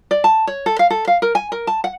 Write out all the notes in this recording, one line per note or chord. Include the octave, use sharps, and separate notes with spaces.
D5
A5
C#5
A4
F5
A4
F5
A#4
G#5
A#4
A5
F#5